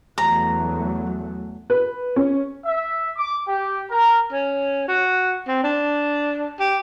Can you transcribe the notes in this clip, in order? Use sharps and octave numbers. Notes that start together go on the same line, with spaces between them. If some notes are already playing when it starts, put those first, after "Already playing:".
E2 F#3 A3 A#5
B4
C#4
E5
D6
G4
A#4
C#4
F#4
C4
D4
G4